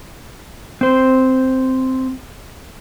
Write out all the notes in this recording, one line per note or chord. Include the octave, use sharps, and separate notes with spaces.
C4 C5